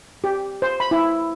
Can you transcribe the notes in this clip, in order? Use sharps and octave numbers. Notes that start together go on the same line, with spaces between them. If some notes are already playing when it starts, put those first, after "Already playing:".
G4
C5
B5
E4